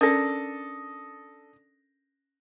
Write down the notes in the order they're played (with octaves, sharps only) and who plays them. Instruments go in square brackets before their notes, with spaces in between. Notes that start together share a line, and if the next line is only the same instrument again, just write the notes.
[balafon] C#4 A#4 [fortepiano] D4 A4 [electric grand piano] D#6 A#6